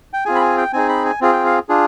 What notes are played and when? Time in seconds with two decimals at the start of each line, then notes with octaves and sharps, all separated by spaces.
0.13 G5
0.25 C4 F4 G#4 G#5
0.35 B5
0.41 G#5
0.57 G5
0.73 C4 D#4 G#4 G#5
0.89 B5
1.05 G#5
1.21 C4 F4 G#4
1.33 G5
1.45 F5
1.69 D4 F4 G#4